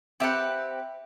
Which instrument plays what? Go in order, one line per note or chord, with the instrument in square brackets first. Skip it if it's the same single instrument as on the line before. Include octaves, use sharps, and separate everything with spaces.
[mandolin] C4 G4 B4 F#5 [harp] E5 G5